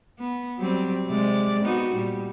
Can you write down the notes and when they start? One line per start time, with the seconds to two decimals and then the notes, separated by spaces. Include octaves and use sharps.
0.19 B3
0.58 F#3 G3 C4
1.06 C3 G#3 D5
1.64 B3 D#4 F#4
1.95 A#2 G3